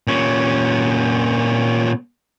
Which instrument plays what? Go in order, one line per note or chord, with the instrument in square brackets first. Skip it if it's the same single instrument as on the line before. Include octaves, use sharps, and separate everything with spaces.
[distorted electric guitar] A#2 C#4